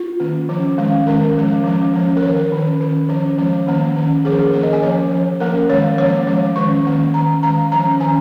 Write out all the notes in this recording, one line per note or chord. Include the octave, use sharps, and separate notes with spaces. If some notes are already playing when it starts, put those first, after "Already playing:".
Already playing: F4
D#3 A#3 C#4
F3 C#4
D#3 G#3 C#4
D#3 G#3 C#4 A#4
F3 G#3 C#4
F3 G#3 C#4
F3 A#3 C#4
A#4
D#3 C#4 C#5
A#4
D#3 C#4
D#3 C#4
F3 C#4
F3 G#3 C#4
D#3 A#3 C#4
D#3 C#4
F3 A#3 C#4 G#4
A#4
G#4
D#3 A#3 C#4 A#4
D#5
G#5
F3 A#3 C#4 C#5
F3 C#4
F3 A#3 C#4 A#4
D#3 G#3 C#4 C#5
F3 A#3 C#4 C#5
F3 G#3 C#4
D#3 G#3 C#4 C#6
D#3 A#3 C#4
D#3 C#4 A#5
D#3 G#3 C#4 A#5
F3 C#4 A#5
D#3 C#4 G#5